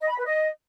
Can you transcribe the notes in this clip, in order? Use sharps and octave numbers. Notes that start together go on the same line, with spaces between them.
D#5
B5
B4
D#5